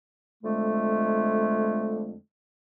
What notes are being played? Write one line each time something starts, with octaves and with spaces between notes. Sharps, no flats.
F2 D3 G#3 A3